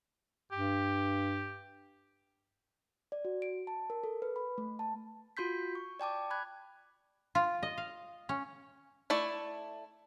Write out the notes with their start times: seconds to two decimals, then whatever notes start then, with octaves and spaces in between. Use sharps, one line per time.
0.52 G2 G4
3.12 D5
3.25 F#4
3.42 D7
3.67 A5
3.90 A#4
4.04 A4
4.22 B4
4.36 B5
4.58 A3
4.79 A5
5.37 F4 F#4 C6 G6 B6
5.75 C#6
6.00 D5 G5 A5 D6
6.31 B5 F#6 G#6
7.35 F4
7.63 D#5
7.78 F5
8.29 C#4
9.10 A3 E4 D5